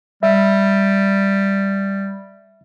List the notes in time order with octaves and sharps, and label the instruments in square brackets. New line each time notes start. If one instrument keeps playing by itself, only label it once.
[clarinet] G3 [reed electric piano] E5